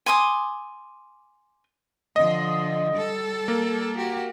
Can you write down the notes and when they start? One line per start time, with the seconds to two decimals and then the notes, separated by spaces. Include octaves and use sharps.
0.06 G#5 C6 D6 D#6
2.16 D3 F3 D#5
2.93 G3 A4
3.48 A#3
3.97 F#4 G4